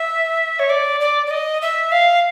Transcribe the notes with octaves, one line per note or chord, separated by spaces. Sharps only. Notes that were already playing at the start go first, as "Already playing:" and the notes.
Already playing: E5
C#5
D5
D5
D5
D#5
E5
F5